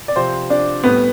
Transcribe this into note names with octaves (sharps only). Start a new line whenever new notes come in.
D5
C3 F3 C4 C5
D4 D5
A2 G3 B3 B4